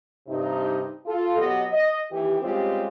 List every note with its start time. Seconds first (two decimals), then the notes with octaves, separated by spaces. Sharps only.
0.27 G2 C3 D#4
1.06 F4 A4
1.37 B2 F#3 B3 G4 B4 D#5
1.71 D#5
2.11 D#2 D#3 E3 G4
2.41 G3 G#3 C4 C#4 F4 G4